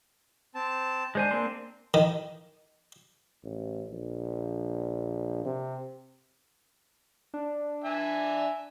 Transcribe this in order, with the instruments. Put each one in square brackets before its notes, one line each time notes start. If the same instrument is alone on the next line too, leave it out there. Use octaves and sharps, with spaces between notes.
[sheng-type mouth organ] C4 A5
[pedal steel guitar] G#3 C5 G#5 [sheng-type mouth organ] D4
[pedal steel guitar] A#3 C4 C6
[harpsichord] D#3
[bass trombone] A1
A#1
C3
[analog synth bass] D4
[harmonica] E5 G#5